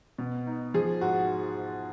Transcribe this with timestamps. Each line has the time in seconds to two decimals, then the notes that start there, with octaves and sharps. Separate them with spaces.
0.18 B2
0.47 D#4
0.74 F3 G#4
1.01 G#2 F#4